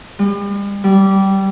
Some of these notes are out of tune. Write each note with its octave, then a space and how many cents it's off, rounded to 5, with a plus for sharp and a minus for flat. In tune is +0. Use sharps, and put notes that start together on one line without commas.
G3 +40
G3 -15